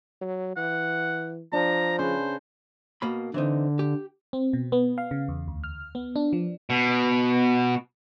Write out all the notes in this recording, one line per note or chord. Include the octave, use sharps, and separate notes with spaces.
F#3
E3 F#5
F3 D4 A#5
C#3 B4 C5
B2 A#3 B5
D3 E3 C4 D#4
G4
C4
B2
B3
F5
C#3
E2
D2
F6
B3
D4
F3
B2